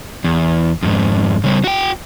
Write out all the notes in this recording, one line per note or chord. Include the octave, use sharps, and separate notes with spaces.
E2
F2 G#2
C#3 G3
F#4 G5